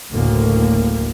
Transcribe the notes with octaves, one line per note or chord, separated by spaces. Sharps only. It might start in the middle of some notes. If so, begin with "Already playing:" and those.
F#1 D2 A2 A#3